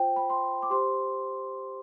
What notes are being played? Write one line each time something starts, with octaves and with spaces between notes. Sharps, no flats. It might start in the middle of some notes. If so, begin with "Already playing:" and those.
Already playing: F4 C5 G5
B5
C6
D6
G4 C5 C6